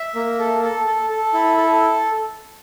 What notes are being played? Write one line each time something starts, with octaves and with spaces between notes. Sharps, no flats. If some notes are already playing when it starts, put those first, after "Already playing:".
Already playing: E5
A#3
A4
A4
A4
A4
E4
A4